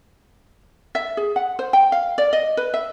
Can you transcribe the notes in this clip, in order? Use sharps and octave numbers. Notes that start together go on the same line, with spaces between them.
E5
G#4
F#5
C5
G5
F5
D5
D#5
B4
E5